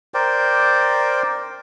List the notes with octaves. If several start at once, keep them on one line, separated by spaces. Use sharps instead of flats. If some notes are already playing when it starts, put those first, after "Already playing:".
A#4 C5 D5 G5